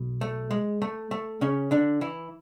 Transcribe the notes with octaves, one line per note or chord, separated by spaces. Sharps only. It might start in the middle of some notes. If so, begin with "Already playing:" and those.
Already playing: B1 B2
A3
G#3
A3
A3
C#3 C#4
D3 D4
E3 E4